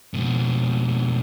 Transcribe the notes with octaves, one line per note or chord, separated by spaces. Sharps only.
F2 B2